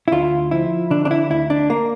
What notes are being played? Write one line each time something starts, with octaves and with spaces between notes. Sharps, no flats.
E4
D2 F4
F3 E4
D3 D4
D4
E4
D2 E4
D4
A#3